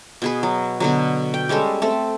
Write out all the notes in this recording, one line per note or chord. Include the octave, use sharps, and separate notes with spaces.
B2 G#4 B4
F#3
B2 D3 F#3
G5
G3 G#3 C#4 A4
A3 C4 A4